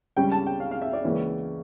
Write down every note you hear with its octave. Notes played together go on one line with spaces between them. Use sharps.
C#2 C#3 G3 G5
A5
G5
F5
F5
E5
D5
C#2 C#3 E3 A#3 C#4